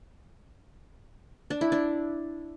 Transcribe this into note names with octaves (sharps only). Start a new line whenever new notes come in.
D4
E4
D4